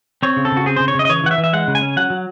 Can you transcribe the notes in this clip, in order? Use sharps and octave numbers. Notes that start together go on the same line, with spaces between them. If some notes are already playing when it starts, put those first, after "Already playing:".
C4 C#5
C#3
A4
C#3 F#4
C4 G#4
C#3 C5
C#5
C#3 D#5
D#5
E3 C#5
E3 F#5
E5
E3
E5
G#3 F#5
C#3
G#5
C#4
F#3 F#5
F#3